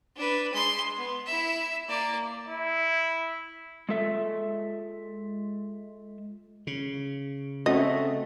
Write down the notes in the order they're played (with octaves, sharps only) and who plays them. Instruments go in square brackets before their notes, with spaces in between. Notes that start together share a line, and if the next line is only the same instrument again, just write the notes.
[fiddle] D4 B4
G#3 C6
B3
E4 E5
A#3 D5
[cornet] E4
[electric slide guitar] G#3 F4 A4 E5
[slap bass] C#3
[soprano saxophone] A3 [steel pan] C4 C#4 F#4 [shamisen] D#5